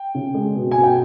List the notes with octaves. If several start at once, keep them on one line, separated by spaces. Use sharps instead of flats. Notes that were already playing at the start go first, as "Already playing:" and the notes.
Already playing: G5
C#3
G#3
B2
G#5
B2
G5